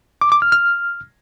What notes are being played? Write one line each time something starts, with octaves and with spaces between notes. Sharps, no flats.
D6
D6
F6
F6